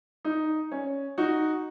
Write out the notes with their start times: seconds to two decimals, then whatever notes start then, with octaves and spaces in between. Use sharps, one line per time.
0.25 D#4
0.71 C#4
1.18 D#4 F#4